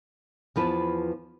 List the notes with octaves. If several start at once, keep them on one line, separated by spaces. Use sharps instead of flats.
E2 F3 B4 A5